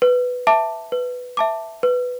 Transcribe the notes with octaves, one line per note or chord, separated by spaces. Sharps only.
B4
E5 A5 D6
B4
E5 A5 D6
B4